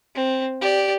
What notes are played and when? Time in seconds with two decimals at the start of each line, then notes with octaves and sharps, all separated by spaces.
0.15 C4
0.61 G4 D5